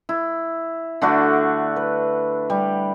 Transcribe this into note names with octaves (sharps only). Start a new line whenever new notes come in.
E4
D3 A3 D4 F#4
B4
G3